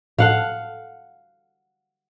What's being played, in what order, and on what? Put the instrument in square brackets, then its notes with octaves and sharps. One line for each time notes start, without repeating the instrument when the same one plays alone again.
[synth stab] A2 A4 [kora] F5 F#5